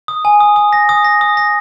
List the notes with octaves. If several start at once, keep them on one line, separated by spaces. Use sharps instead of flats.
D#6
G#5
D#6
D#6
A#6
D#6
A#6
D#6
A#6